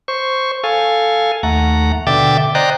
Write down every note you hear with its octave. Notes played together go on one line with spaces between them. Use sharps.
C5 C#6
A4 F5 G#5
D#2 A3 F#5 A#5
B2 D3 E5 G5 D6 A6
C5 D5 D#5 G5 A#5 F#6